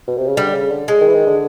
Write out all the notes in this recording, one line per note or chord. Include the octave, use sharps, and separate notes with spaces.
B2
C3
C#3
D3 G3
C#3
D3
G#3
D#3
E3
D#3
D3